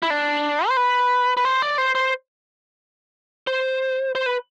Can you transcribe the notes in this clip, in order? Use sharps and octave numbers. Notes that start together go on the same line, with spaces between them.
E4
D4
C5
B4
B4
C5
D5
C5
C5
C5
C5
B4